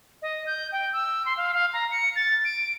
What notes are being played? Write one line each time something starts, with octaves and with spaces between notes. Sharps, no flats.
D#5
G6
G5
E6
C6
F5
F5
A#5
C#7
A6
D7